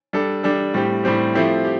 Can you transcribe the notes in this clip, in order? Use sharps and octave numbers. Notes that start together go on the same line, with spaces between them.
G3 D4 A4
G3 D4 A4
A2 G3 C4 G4
A2 G3 C4 G4
F3 A3 C4 E4 G4
G4